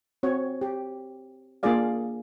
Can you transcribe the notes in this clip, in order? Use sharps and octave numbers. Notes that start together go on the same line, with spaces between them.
C4 F#4 C#5
G4
A#3 D4 F4 G#4 D5 F5